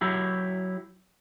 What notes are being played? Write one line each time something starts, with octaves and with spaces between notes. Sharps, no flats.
F#3 E4 G4